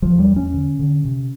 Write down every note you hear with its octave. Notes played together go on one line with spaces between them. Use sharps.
E2 F3
G3
E2
C#4
D3
D3
C3